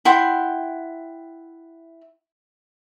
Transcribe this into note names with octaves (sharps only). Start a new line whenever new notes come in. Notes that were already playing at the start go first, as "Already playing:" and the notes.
E4 F#5 G5 C6